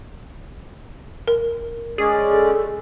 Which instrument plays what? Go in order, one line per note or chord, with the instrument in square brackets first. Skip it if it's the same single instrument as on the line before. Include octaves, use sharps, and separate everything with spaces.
[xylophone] A#4
[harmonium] G#3 C#4 D5 [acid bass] G#4
[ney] A4